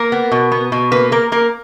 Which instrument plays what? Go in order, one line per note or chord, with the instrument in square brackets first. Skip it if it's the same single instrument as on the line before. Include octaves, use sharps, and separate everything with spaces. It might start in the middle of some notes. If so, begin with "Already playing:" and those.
Already playing: [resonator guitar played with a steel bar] A#3 A#4
B3
B2
B3
B2
A#3 B4
A#3 A#4
A#3 A#4